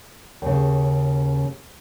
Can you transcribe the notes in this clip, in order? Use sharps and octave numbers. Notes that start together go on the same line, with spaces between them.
D#2 C#3